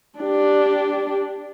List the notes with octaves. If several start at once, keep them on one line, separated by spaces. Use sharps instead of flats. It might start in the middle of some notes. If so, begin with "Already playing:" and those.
D4 G4